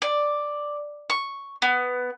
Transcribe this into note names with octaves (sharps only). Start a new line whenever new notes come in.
D5
C#6
B3